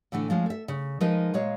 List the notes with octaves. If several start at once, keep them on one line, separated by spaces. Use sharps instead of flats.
A2 D3 E3 A3
F3 G#3 C#4
A4 E5
C#3
F3 G#3 D#4 A#4 B4
A#2 G#3 C#5 F5